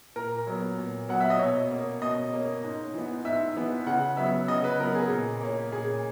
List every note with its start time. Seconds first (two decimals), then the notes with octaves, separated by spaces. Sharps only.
0.16 A#2 A#4
0.47 F#3 B3
0.78 A#2
1.08 F#3 B3 F#5
1.20 E5
1.30 D#5
1.39 B2 C#5
1.71 A#3 C#4
2.02 B2 D#5
2.33 A#3 C#4
2.63 G#2
2.94 E3 B3
3.25 G#2 E5
3.56 E3 B3
3.86 C#3 F#5
4.17 F#3 B3 E5
4.48 C#3 D#5
4.64 B4
4.79 F#3 B3 A#4
4.95 G#4
5.10 A#2
5.41 A#3 C#4
5.72 A#2 G#4